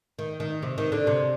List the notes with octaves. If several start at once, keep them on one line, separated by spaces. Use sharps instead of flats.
D#3
D#3
C3
D#3
D3
C3